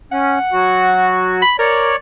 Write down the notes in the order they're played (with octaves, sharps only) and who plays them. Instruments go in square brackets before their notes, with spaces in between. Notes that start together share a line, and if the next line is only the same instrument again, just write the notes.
[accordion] C#4 [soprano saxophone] F#5
[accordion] F#3 F#4
[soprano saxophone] B5
[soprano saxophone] A#4 [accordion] C#5 D5